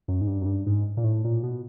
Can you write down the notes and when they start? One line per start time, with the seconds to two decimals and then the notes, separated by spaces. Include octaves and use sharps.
0.08 F#2
0.21 G#2
0.27 G2
0.41 F#2
0.46 G2
0.66 G#2
0.97 A#2
1.04 A2
1.24 A#2
1.43 B2